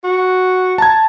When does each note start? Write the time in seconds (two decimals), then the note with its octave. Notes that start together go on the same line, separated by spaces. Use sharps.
0.04 F#4
0.78 A5 A#5 G#6